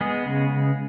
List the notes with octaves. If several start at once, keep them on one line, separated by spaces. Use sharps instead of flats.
G#3 B3 G#4
C#3